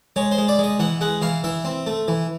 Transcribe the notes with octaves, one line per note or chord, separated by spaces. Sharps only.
G#3 C#5
C5
G#3
D5
G#3 D#5
E3 F#5
G#3 F#5
E3 F5
E3 E5
C4
A3
E3